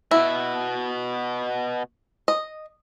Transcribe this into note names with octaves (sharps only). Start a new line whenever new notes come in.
B2 E4 F#4
D#5